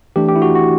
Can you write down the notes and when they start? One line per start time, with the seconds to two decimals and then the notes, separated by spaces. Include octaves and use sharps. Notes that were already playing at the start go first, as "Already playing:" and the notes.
0.16 E3 A3 D4 G4
0.29 G4
0.35 E4
0.42 F#4
0.55 F#4